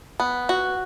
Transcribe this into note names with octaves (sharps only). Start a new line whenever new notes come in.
B3
F#4